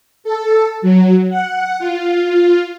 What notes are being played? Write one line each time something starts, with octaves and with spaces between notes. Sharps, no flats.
A4
F#3
F#5
F4